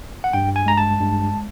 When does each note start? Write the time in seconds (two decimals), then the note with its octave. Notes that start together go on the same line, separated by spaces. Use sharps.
0.24 F#5
0.33 G2 G5
0.56 G#5
0.66 G#3 A#5
0.78 A5
1.00 G2